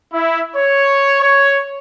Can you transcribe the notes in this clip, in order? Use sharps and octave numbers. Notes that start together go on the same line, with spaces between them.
E4
C#5
C#5